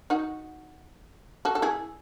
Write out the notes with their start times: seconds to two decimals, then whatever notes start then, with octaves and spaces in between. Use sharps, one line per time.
0.10 D#4 F#4
1.45 F#4 A4
1.55 A4
1.62 E4 G#4